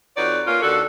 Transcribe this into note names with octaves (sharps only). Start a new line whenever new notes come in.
F2 D#4 F#4 B4 C#5 D5
A#3 C#4 F4
D#2 D#3 D4 F#4 A4